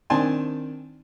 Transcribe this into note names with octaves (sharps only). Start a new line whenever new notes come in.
D#3 C4 D4 G#5 A5 C6